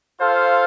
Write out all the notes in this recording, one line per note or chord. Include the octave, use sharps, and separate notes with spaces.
F4 A4 C5 F5